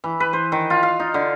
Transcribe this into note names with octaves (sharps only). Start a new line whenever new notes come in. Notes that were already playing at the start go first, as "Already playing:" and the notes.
E3
B4
C5
D#3
F4
F5
D#4
D3